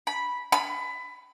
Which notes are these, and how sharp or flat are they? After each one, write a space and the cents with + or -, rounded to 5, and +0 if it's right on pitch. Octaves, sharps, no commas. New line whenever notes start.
B5 -5
B5 +20